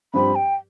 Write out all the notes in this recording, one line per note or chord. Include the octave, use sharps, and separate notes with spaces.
G2 F3 C4 G4 B5
G5